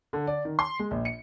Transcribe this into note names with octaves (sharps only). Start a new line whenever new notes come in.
D3
D5
D#3
C6
G#3
A#1
C#7